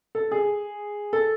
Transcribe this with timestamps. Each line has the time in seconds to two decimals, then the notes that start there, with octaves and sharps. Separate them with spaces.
0.15 A4
0.31 G#4
1.13 A4